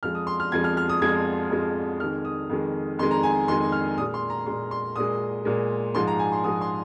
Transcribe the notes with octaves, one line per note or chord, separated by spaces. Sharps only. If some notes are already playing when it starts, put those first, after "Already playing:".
F2 F3 G#3 F6
D#6
C6
F6
F2 F3 G#3 G#6
F6
F6
D#6
F2 F3 G#3 G#6
F2 F3 G#3
F2 D#3 G#3 F6
D#6
F2 D#3 G#3
F2 D#3 G#3 C6
A#5
G#5
F2 D#3 G#3 C6
F6
A#2 G#3 D#6
C6
A#5
A#2 G#3 C6
C6
A#2 G#3 D#6
A#2 G#3
G#2 F3 G#3 C6
A#5
G#5
C6
G#2 F3 G#3 D#6
C6